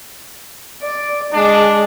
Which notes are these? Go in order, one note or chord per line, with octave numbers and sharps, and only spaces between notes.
D5
G#3 D4